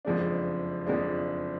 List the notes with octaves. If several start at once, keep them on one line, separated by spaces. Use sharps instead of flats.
F#1 F2 F3 G#3 D4
F#1 F2 F3 G#3 D4